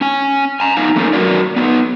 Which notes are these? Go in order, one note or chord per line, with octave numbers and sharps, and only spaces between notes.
C#4 G#5
G#5 A#5
B3 D#4 F5 G#5
A3 A#3 C#4 D#4 A4 A#4
F#3 F#4 A#4 D5
B3 D#4 B4